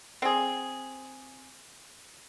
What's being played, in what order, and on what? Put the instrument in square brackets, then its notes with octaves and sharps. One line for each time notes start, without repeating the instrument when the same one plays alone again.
[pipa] C4 G#4